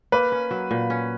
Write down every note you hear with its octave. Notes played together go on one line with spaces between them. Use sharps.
A#3 B4
C#4
F#3
A#2
C#4